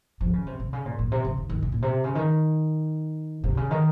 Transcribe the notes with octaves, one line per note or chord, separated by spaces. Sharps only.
F3
C#3
C3
C3
C#3
A#2
A#2
C3
C#3
D#3
D#3
C3
A#2
C3
C#3
D#3
C3
C#3
D#3